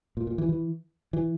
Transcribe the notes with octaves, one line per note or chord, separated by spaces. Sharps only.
A#2
A#2
E3
E3
E3